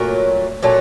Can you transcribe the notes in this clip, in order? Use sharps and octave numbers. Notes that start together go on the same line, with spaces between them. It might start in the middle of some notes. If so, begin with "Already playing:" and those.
Already playing: A#2 F#3 A3 A#4
A#2 F#3 A3